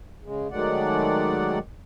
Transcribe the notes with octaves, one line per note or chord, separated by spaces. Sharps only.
C#3 G#3
D#3 F#3 G#3 A3 D5 F#5